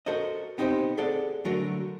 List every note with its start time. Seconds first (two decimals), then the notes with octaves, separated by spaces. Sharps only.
0.06 F#4 A4 A#4 C5 D#5
0.58 B3 C4 D#4 F#4 G4 C5
0.97 G#4 A4 D5 F#5
1.45 D3 F#3 A3 F#4 A#4